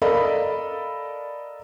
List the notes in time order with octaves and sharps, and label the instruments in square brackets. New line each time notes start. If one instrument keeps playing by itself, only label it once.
[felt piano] A4 A#4 D5 D#5 F5 B5